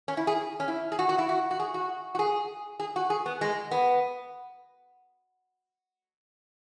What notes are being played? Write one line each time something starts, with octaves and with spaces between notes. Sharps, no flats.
C#4
E4
G#4
C#4
E4
G#4
F#4
F#4
E4
F#4
F#4
G#4
F#4
F#4
G#4
G#4
F#4
G#4
B3
G#3
B3